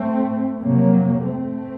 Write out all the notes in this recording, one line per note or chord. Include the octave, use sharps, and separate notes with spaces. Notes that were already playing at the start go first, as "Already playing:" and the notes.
Already playing: A3 C4
F2 C3 F#3 A#3
A3 C4